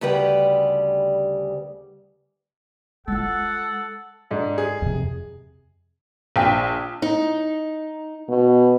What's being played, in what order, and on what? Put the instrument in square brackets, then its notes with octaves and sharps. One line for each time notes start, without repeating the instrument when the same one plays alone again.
[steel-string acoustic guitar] D2 C#3 G3 B4 G5
[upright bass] G#3 F4 [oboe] A4 [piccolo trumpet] F#5
[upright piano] G#2 D4
G#4
[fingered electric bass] F2 C3
[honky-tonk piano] A#1 [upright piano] F5 G5 B6
[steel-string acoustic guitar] D#4
[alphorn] B2